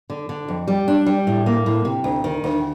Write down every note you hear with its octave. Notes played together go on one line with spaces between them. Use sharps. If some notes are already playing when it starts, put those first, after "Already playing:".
D3
D3
F2
G3
D4
G3
A2
A#3
A2
C3
D2
D#3
D2